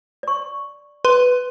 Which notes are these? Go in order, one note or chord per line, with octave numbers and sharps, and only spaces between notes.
D5 C#6
B4 C6